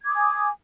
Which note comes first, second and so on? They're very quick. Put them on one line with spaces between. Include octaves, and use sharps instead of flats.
G#6 D6 D#6 G#5